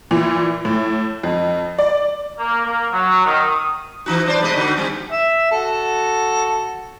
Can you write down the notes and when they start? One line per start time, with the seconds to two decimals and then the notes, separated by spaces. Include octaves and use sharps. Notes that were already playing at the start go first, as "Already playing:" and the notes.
0.11 A#2 E3
0.65 A2
1.23 F2
1.79 D5
2.39 A#3
2.65 A#3
2.92 F#3
3.25 D#3
3.47 D#6
4.06 E3 D#4 F#4
4.26 G2 C5 D5
4.41 C3 G#3 D#5
4.56 D3 D#4 F#4
4.76 G3 C4
5.12 E5
5.51 F#4 A4